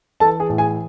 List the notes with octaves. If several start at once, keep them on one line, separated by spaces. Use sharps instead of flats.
E3 A4 A5
G#4 G#5
A2
G#4 G#5